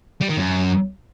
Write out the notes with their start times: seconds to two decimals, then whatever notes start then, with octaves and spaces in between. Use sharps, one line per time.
0.21 G3
0.29 D#3
0.37 F#2